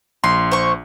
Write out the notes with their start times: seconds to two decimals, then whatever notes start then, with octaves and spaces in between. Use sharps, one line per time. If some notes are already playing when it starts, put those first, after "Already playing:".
0.24 A#1 C6
0.52 C5 C#6